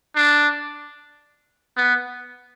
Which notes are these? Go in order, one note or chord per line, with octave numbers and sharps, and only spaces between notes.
D4
B3